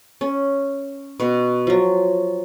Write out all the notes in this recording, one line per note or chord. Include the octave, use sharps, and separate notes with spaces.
C#4
B2 F#4
F3 F#3